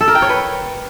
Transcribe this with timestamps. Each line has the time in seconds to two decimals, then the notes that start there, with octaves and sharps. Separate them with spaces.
0.01 A4
0.08 A#4
0.15 G5
0.22 C#5
0.29 B4